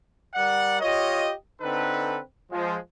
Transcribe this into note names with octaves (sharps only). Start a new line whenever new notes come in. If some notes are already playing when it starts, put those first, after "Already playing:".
G3 A#4 D5 F#5
F4 G4 C#5 D#5
D3 C4 D#4 A4 B4
F3 G#3